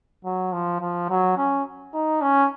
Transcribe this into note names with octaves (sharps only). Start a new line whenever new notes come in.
F#3
F3
F3
F#3
C#4
D#4
C#4